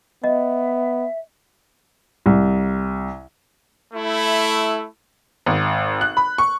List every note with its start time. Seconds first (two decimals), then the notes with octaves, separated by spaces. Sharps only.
0.24 B3 D#5 E5
2.26 C2
3.94 A3 E4
5.46 G#1
6.01 F#6
6.17 B5
6.38 C#6